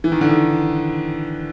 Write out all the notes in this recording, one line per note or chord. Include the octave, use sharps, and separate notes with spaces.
E3
D#3
D3
D#3